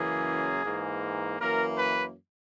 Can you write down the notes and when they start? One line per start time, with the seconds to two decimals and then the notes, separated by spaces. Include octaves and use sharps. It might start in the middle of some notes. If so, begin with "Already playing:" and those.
Already playing: F#2 C#3 E3 A#3 G#4
0.65 G#2 E3 A#3
1.40 F#2 E3 A#3 A#4
1.77 B4